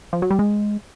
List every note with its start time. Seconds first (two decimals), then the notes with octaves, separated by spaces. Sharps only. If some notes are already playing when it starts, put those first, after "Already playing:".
0.13 F3
0.22 F#3
0.31 G3
0.39 G#3